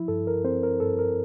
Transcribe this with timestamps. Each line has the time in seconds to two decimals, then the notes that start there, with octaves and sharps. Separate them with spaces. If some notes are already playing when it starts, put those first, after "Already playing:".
Already playing: F3 E4
0.08 G2 A4
0.27 A#4
0.44 C4 C5
0.63 A#4
0.80 G2 A4
0.99 A#4